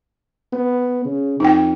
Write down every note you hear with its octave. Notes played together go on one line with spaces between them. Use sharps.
B3
C#3
F2 D#4 G5